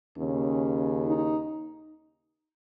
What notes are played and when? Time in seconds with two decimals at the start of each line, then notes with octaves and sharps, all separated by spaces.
0.16 D#2 C#3 C#4
1.06 D#4